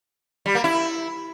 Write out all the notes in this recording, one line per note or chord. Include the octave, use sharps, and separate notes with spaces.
G3
A#3
E4